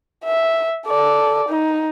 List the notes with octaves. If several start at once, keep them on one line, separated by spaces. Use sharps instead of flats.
E5
A4 D5
D#4